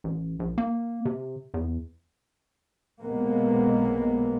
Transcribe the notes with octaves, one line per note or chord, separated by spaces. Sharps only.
A1
A#1
A#3
C3
E2
B1 C3 G#3 A#3 B3